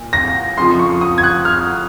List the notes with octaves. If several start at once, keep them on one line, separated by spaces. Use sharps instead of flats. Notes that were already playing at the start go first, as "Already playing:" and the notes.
Already playing: A#2
A#6
F2 C#3 F3 C6
C#6
D#6
G#6
F#6
F6